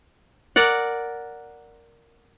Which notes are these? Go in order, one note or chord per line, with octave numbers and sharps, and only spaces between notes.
A#4 D5 F#5